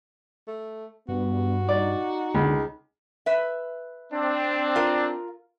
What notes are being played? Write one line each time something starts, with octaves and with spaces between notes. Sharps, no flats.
A3
G2 B3 F#4
D#4 D5
C#2 D3
B4 E5
C4 D4
F4 A#4